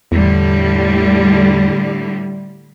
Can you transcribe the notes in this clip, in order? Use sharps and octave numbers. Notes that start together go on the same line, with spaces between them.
E2 A2 D3 G3